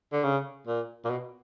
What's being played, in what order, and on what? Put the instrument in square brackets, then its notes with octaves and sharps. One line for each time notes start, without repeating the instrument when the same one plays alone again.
[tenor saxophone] D3
C#3
A#2
A#2
B2